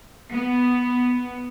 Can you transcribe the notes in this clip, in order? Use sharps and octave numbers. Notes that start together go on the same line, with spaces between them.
B3